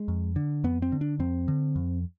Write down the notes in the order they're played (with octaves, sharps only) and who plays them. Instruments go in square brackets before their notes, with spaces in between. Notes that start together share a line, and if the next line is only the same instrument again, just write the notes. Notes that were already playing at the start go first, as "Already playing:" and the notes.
Already playing: [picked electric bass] G#3
F2
D3
F2 B3
C4
D3
D4
F2 C4
D3
F2